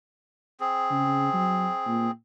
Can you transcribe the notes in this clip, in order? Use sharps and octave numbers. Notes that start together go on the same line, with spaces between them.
C4 G#4
C#3
F#3
A#2